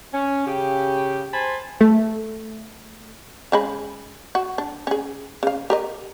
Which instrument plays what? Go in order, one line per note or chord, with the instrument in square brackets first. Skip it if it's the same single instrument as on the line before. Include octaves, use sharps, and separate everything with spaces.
[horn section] C#4
C#3 G4
C5 G#5 A5 B5 C6
[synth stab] A3
[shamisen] C#3 G#3 B5
F#4
D4
C#4 G#4
C#3 F5
G4 A#4 D#5